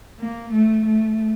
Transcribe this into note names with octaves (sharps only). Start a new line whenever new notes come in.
A#3
A3
A3